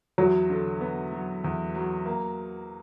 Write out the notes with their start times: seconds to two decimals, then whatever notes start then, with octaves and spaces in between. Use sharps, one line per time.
0.18 E2 F#3
0.50 D3
0.81 B3
1.12 F#3
1.44 E2
1.75 F#3
2.06 A#3